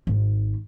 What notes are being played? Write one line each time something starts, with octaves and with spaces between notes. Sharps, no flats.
G#1